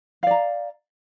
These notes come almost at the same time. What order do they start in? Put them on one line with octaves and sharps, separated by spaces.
F5 D5 A#5